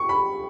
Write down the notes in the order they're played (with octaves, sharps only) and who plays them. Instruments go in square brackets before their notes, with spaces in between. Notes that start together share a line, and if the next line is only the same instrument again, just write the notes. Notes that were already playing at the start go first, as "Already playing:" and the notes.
Already playing: [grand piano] C#6
B5